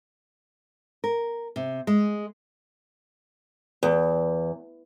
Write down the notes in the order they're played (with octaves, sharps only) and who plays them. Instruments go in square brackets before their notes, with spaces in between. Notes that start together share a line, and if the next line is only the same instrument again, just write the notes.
[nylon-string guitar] A#4
C3
G#3
[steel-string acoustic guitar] E2